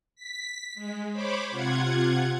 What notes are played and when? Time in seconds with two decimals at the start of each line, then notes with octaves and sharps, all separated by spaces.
0.15 B6
0.75 G#3
1.12 C5 C#5 B5 D6
1.51 C3 F4 F#5 G#6